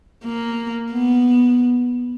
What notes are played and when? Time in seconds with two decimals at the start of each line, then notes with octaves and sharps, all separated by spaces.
0.24 A#3
0.92 B3